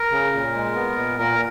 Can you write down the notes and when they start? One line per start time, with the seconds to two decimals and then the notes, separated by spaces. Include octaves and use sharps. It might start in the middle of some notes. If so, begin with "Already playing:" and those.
Already playing: A#4
0.11 C#3
0.33 A#2
0.54 G#3
0.75 B3
0.97 A#2
1.18 A#2 A#4